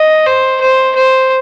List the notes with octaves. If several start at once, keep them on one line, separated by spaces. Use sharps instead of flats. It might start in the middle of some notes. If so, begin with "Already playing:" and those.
Already playing: D#5
C5
C5
C5